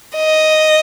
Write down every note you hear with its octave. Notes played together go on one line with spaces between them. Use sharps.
D#5